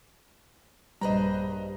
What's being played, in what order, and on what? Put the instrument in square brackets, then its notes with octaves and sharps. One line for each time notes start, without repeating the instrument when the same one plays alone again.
[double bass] A#1 G2 [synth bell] G3 [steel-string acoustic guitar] G4 B4 C5 [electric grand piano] D#5 A#5